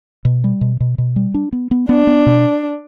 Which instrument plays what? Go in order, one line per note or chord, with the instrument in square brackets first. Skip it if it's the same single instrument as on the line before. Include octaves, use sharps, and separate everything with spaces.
[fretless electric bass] B2
G3
B2
B2
B2
G3
D4
B3
B3
[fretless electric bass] B3 [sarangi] D4
[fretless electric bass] B3
B2